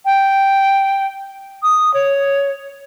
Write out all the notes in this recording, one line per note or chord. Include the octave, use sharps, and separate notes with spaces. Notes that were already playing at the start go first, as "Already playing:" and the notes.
G5
D#6
C#5